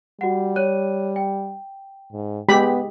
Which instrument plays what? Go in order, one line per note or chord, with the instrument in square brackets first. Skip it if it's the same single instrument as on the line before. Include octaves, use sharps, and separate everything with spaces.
[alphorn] G3 [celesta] F#4 F#5
[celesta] C#5 F#6 D#7
G5
[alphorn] G#2
[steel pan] G#3 G4 B5 [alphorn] B3